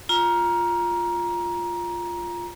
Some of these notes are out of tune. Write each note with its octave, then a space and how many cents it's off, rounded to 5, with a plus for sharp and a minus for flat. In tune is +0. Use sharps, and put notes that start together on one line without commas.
F4 +0 A#5 +20